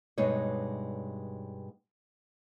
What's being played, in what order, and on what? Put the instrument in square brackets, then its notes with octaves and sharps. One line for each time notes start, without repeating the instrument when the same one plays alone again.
[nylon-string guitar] G2 B2 G#3 D#4 C#5